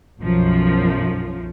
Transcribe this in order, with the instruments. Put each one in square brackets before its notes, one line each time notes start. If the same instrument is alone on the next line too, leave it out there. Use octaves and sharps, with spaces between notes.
[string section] B1 F#2 F3